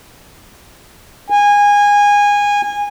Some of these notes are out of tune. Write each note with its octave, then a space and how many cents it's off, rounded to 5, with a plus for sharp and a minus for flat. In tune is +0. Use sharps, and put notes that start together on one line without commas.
G#5 -20